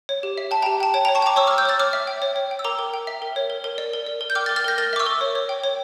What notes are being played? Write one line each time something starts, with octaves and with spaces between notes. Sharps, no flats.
C#5
G4
E5
G5 A5
G5 A#5
G4
G5 A5
C#5 G5
G5 A#5
C#5
A5 C#6
G5 A#5 D6
C#5 C#6 E6
D6 F6
C#5
E6 G6
C#5 F6 A6
C#5 D6 F6
E5
G5
C#5
C#5
G5
E6
A#4 A#5 D6
A#4
G5
E5
A#4
C#5
A#4
A#4
D5
A#4
D5
A#4
G6
G5 D6 F6
F6 A6
A#4
F6 A6
A#4 G6 A#6
A#4 F6 A6
E5 D6
C#6 E6
A#4
C#5
C#5
G5
C#5